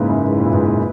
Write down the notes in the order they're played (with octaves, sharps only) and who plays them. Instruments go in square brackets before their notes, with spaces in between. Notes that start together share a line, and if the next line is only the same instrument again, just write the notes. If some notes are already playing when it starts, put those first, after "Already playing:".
Already playing: [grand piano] G#2 C#3 [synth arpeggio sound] A#3 E4 B4
[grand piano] F#2
G#2
A#2
G#2
A#2